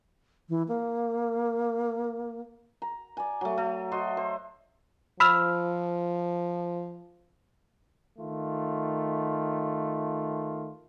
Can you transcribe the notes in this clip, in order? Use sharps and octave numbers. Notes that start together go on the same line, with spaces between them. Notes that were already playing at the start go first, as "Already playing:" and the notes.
E3
A#3
A#5
D5 G#5
F#3 A3
A3
F#4 C5 D#5
C5
F3 B5 E6 F6
D#3 A3 F4